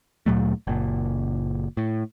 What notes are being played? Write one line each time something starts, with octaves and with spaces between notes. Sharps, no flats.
D2 A#2 F#3 A3
F#1 A#2
A2